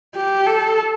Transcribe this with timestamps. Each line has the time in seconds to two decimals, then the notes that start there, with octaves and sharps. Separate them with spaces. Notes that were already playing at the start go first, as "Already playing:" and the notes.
0.16 G4
0.47 A4